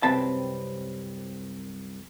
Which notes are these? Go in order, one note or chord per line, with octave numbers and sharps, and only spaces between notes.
C2 F#2 C3 C4 B4 A5